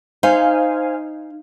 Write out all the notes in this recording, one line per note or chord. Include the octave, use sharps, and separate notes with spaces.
D#4 C5 F5 G#5